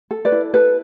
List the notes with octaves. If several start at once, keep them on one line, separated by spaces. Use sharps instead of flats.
A4
B4 D5
E4
A4 B4